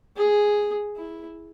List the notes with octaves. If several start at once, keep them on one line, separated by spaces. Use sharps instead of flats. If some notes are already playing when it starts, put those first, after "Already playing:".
G#4
E4